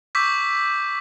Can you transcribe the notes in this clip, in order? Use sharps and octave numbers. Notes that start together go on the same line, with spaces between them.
C#6 D6 E6 G6 B6